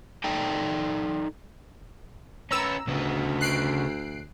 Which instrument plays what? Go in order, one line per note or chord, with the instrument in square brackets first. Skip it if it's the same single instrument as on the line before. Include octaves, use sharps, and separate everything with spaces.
[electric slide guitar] D#4 A4 D5 G5 A5
[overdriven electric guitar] C#4 B4 [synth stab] A#5 E6
[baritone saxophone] D2 [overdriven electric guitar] C#3 B3
[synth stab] F#6 C7 D7